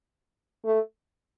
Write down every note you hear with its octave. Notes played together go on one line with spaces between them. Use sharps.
A3